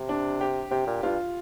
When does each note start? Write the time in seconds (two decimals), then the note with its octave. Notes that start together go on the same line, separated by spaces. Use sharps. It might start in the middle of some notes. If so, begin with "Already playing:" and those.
Already playing: C3
0.09 D4
0.41 G4
0.71 C3 G4
0.87 A#2
1.03 G2 F4